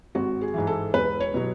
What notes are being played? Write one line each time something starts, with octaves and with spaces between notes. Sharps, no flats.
G#1 F#4
G#4
G#2 E3
A4
E1 B4
C#5
B2 F#3